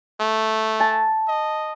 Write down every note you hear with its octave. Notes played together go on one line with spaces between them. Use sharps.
A3
A5
D#5